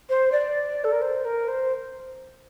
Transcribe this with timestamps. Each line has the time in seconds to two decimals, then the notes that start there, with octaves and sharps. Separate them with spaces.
0.09 C5
0.32 D5
0.84 A4
0.92 A#4
1.02 C5
1.25 A#4
1.48 C5